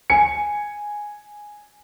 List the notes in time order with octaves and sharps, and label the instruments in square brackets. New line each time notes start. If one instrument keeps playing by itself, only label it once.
[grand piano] G#5 C#7